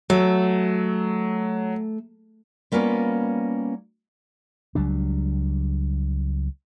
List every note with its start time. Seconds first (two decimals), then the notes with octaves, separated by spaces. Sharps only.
0.10 F#3 A3
2.72 G3 A#3 B3 C#4 F4
4.75 C#2 F#3 G3 D4